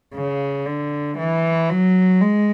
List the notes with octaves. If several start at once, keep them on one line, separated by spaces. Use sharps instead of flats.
C#3
D3
E3
F#3
G#3